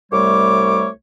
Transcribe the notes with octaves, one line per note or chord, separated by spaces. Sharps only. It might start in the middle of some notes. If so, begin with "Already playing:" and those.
C2 G3 A3 C#5 D6